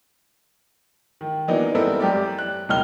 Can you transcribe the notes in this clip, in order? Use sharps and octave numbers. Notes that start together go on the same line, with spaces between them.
D#3
E3 F#3 A#3 B3 D4 D#4
G3 B3 C4 E4 A4 A#4
F#2 G4 D5
F#6
E1 C#2 F#2 D#4 F6 G7